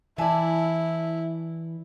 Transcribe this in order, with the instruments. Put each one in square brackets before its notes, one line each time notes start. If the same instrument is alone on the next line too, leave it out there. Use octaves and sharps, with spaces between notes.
[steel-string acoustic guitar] E3 D5 [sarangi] E4 [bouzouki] E5 G#5 A5